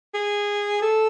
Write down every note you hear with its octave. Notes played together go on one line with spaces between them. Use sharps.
G#4
A4